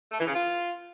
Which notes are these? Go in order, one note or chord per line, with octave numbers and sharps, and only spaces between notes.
A3
E3
C#3
F4